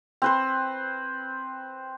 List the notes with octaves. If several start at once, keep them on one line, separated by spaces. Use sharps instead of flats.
C4 B4 C5